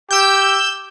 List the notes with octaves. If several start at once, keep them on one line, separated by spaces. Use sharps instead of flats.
G4 E6 G6